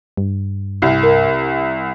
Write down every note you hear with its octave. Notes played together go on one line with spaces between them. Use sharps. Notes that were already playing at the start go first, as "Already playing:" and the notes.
G2
C2
A#4